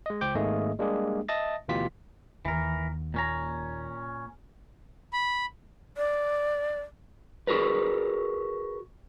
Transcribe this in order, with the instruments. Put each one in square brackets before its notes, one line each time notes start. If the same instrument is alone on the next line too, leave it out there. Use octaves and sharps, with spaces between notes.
[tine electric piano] G#3 D#5
C#2 C5 G5 D6 G6
G#1 G#2 A3 A#3 G#4 D#5
G3 G#3 A#3 D4 G4 G#4
D#5 E5 A5 D#6 A6 A#6
D2 B2 E3 F4 G4 B6
[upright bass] D#2 [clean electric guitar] E3 A#4
[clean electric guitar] A#2 C#4 A#5
[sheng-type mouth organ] B5
[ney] D5
[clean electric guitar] F#4 G#4 A#4 B4